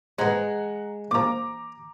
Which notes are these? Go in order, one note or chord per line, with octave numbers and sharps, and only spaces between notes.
G#2 G#3 B4 F#5 A#5
A#2 F3 A#5 D6